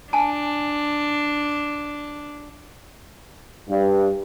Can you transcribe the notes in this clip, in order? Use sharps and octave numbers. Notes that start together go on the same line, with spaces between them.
D4 G#5 A5
G2